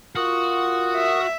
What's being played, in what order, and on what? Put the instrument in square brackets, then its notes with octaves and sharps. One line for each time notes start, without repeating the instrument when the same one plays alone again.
[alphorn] F4 [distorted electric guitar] F#4 [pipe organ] A#4 D#6
[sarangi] E5